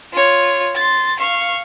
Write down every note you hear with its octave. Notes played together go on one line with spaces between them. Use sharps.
F4 C#5
C6 A6
F5 C#6